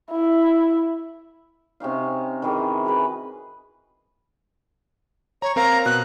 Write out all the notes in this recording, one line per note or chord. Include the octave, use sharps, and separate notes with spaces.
E4
C3 C#4 D#4 F5
D#3 E3 G#4 A#4
F#4 G#4 B4
C#5 A#5
C4 A#4 F5 A#5
B2 F#6